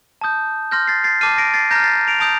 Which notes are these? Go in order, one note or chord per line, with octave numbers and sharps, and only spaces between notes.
A5 D#6 G6
C6 F6 G6 A#6
A6 C7
A6 C7
A5 D6 F6 C7 D#7
A#6 D7
A6 C7
A#5 F6 G6 A#6
A6 C7
D7 F7
A5 D#6 G6 D7 F7